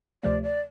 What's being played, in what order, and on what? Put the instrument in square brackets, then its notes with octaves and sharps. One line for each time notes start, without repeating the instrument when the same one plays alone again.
[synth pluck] D2 C3 F3 A3 [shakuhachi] D5
[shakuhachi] D5